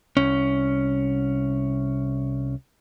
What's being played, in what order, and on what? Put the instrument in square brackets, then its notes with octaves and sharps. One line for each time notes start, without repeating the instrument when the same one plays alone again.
[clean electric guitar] C2 C#4